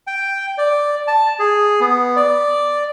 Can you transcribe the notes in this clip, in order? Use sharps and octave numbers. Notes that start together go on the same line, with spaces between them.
G5
D5
A5
G#4
B3
D5